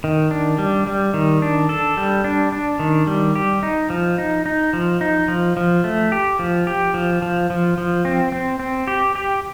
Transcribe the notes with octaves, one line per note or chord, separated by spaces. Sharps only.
D#3
D4
G3
G3
D#3
D4
A4
G3
D4
D4
D#3
G3
G4
D#4
F3
D#4
D#4
F3
D#4
F3
F3
A3
G4
F3
G4
F3
F3
F3
F3
C4
C4
C4
G4
G4